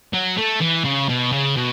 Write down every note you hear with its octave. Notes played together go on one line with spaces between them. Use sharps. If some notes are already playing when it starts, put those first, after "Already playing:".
F#3
A3
E3
C#3
B2
C#3
B2